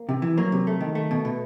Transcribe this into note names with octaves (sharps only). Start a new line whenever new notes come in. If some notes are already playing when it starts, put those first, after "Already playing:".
Already playing: A#3
C3
E3
F#3 A#3
C3
A3
D#3
A3
B2
B2